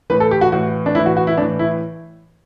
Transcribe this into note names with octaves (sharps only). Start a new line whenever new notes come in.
A2 E3 B4
A4
G4
F#4
A2 E3 F#4
D4
A2 E3 E4
F#4
F#4
E4
A2 E3 D4
E4